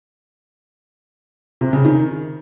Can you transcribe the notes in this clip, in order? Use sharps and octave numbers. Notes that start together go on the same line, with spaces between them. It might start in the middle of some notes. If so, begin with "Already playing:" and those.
C3
C#3
D#3